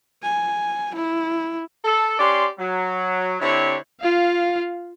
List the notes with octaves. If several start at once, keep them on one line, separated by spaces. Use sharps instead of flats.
G#5
E4
A4
C#4 G4 D5 C6
F#3
D3 C4 E4 G4 C#5
F4 F5